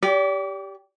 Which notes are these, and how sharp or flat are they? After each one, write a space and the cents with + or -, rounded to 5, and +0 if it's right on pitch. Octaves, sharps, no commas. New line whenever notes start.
G4 +0 D5 -40